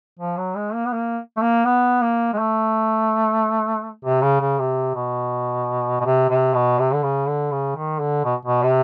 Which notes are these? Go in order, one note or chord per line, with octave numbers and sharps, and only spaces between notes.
F3
F#3
G#3
A#3
B3
A#3
A3
A#3
B3
A#3
G#3
A3
C3
C#3
C#3
C3
B2
B2
C3
C3
B2
C3
D3
C#3
D3
C#3
D#3
D3
B2
B2
C3